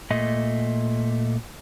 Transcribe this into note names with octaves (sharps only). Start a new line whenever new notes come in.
A#2 A3 D#5